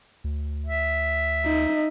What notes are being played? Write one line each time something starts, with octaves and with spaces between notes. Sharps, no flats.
D2
E5
D#4